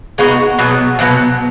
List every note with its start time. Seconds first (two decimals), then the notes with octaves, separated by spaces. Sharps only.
0.18 G#3 B3 D#4 F#4
0.59 B2 F#3 B3
0.99 B2 F#3 B3